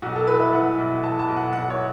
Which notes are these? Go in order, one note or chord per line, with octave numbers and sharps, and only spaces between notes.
B1 F#4
A4
E3 B4
E5
E3 F#5
B1
E3 A5
A5
B1
F#5
B1 F#5
C#5